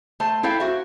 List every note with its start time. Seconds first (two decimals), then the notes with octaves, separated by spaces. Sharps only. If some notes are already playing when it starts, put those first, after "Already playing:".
0.20 A3 C5 A5
0.43 E4 A4 C5 F5 G5
0.60 F#4 E5